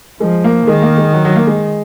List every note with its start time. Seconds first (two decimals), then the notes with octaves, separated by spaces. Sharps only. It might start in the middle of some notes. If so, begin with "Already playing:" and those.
0.20 F3 G#3
0.44 A#3
0.66 D#3 G#3
0.82 A#3
0.97 G#3
1.14 F#3
1.25 F#3
1.36 A#3
1.47 G#3